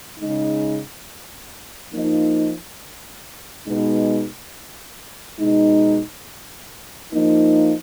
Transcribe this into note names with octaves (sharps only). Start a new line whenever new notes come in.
C#3 G#3 D#4
F3 A#3 D#4
B2 G#3 B3 D#4
B2 G#3 D#4
F3 A#3 D#4